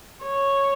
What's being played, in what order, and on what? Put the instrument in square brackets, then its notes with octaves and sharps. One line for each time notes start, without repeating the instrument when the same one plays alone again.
[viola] C#5